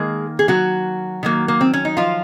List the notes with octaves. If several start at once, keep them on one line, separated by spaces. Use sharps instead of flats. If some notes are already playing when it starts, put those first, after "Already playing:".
Already playing: D#3 G#3 A#3 G#4
G#4
F#3 F#4
D#3 F#3 A#3
A#3
C4
C#4
D#4
F3 F4